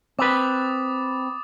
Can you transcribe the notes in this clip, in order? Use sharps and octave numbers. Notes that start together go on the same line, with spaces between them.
C4 B4 D6 D#6 A6